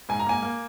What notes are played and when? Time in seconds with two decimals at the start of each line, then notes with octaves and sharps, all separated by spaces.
0.09 G#2 G#5
0.20 A#5
0.26 A#3 G#5
0.43 A#3